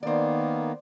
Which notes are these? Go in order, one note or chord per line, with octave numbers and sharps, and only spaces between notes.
D#3 A#3 B3 C5 D5